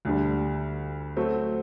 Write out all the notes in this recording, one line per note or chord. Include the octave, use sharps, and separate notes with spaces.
D2 D3 G3
F#3 A3 C4